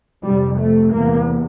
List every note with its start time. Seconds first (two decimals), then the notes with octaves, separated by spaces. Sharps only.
0.23 F2 C3 G3
0.58 A3
0.92 E2 C3 A#3